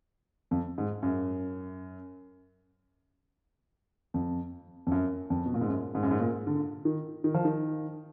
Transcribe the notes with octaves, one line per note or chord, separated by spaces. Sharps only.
F2
G#2
F#2
F2
F2
F#2
F2
B2
A#2
G#2
F#2
G#2
F#2
G#2
A#2
D3
D#3
D#3
F3
D#3